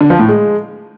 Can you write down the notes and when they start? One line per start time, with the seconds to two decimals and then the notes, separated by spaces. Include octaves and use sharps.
0.01 D3
0.10 F3
0.19 A2
0.29 G#3